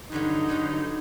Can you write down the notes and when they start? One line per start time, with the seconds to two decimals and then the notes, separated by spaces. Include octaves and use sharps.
0.12 G2 D3 F#3 D#4
0.49 G2 D3 F#3